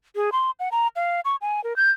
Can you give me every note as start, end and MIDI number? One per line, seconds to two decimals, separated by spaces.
0.16 0.30 68
0.32 0.51 84
0.60 0.69 78
0.72 0.88 82
0.96 1.21 77
1.25 1.36 85
1.41 1.63 80
1.64 1.76 70
1.76 1.91 91